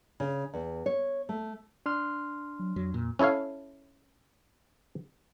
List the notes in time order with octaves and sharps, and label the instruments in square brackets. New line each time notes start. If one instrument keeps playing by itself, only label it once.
[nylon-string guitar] C#3
E2
C#5
A3
[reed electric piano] D4 C6 F6
[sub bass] F#3
[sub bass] F2 [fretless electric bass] F#3
[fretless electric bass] A#2
[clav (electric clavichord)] C#4 E4 A4 C#5 F5